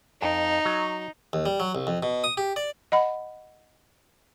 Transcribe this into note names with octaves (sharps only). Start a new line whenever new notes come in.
F2 D#4
F#3
D#2
G3
F#3
C2
F2
B2
D#6
G4
D5
D#5 F#5 B5